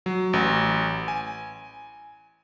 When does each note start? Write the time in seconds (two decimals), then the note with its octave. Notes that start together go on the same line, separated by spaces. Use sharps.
0.06 F#3
0.33 A1
1.08 G#5